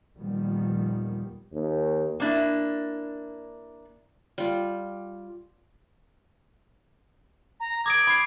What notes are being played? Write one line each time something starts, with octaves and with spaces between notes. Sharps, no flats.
D#2 A#2 D#3 F3 G3 B3
D#2
A#3 D4 E4
G3 F4
A#5
D6 D#6 G#6 D7
B5 C7